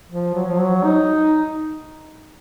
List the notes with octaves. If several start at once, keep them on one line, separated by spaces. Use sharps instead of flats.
F3
F#3
F3
F#3
D#4